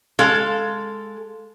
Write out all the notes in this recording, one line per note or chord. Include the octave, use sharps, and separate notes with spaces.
G#3 A4 F5